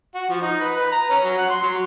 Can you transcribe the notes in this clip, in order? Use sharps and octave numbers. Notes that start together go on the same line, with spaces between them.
F#4
F3
D#4
B4
B4
A#5
C#4
F#3
F#5
C6
F#3